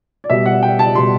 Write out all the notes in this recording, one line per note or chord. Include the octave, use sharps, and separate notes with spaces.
D5
B2 G3 E5
F#5
G5
A5
B2 G3 C6